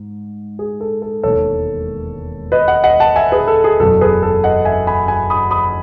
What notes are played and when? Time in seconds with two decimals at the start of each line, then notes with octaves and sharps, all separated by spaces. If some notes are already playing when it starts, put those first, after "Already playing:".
Already playing: G#2
0.59 G#4
0.81 A4
1.02 A4
1.23 E1 D#2 D#3 A4 C#5
2.52 B4 D#5
2.68 D#5 F#5
2.84 D#5 F#5
3.00 F#5 A5
3.16 E5 G#5
3.32 G#4 B4
3.47 A4
3.64 G#4
3.80 F#1 E2 B2 F#3 A4
4.01 G#4 B4
4.23 A4
4.44 D#5 F#5
4.65 E5 G#5
4.87 G#5 B5
5.08 G#5 B5
5.30 B5 D#6
5.51 B5 D#6